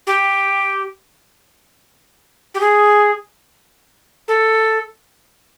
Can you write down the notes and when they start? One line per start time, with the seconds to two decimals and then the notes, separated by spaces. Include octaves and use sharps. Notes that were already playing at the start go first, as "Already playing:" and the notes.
0.07 G4
2.54 G4
2.60 G#4
4.28 A4